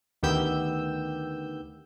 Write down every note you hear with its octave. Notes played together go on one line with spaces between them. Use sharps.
D2 D#3 B3 G4 E6 G6